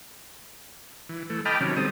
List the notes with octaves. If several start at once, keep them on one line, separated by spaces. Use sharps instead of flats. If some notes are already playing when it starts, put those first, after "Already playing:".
E3
E3 A3
D#5 G5 A5 B5 D6 F6
C3 D#3 F#3 C#4
G3 C4 A4 D#6